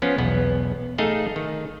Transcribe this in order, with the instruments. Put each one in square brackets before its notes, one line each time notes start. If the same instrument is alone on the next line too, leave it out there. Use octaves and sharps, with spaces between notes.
[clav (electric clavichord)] F3 B3 C#4 F4
B1 E2 B3
A3 D#4 G#4 A4 D#5 F5
D#3